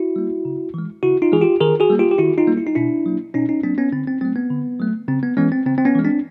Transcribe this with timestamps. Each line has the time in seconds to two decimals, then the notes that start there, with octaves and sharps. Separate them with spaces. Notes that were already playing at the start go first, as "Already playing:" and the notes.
Already playing: E4 F#4
0.16 G3 A#3
0.45 C#3
0.74 E3 G#3
1.03 C#3 E4 F#4
1.22 D#4 F4
1.32 E3 G#3 G#4
1.41 F4 G4
1.61 D#3 G#4 A#4
1.80 F#4 G#4
1.90 G3 A#3
1.99 F4 G4
2.11 G4
2.18 D#3 E4 F#4
2.38 D#4 F4
2.48 G3 A#3
2.57 E4
2.67 D#4
2.75 B2 D4 E4
3.06 F#3 A#3
3.34 B2 C#4 D#4
3.49 C#4 D#4
3.63 F#3 A#3 C4 D4
3.78 B3 C#4
3.92 D3 C4
4.07 C4
4.21 F#3 A3 C4
4.36 B3
4.50 D3
4.80 F#3 A3
5.08 C#3 C4
5.23 B3
5.37 E3 G#3 B3 C#4
5.52 C4
5.66 C#3 C4
5.78 C4
5.85 B3 C#4
5.95 E3 G#3
6.05 C4 D4